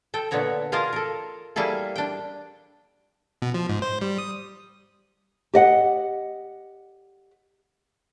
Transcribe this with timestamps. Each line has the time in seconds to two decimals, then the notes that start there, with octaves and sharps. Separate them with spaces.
0.14 A4 G5
0.31 A#2 D3 B3 C#5 A#5
0.72 F4 G#4 A#4 D#5 F5 A5
0.93 A4 A#4
1.56 G3 A#3 E4 G#4 A4
1.96 D4 G5
3.42 B2
3.54 F3
3.69 G#2
3.82 C5
4.01 G3
4.18 D#6
5.54 G4 D#5 F#5